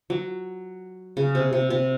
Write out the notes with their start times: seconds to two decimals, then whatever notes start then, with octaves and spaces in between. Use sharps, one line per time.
0.10 F#3
1.17 C#3
1.35 C3
1.53 C3
1.70 C3